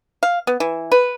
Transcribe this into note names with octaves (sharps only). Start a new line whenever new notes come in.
F5
B3
E3
B4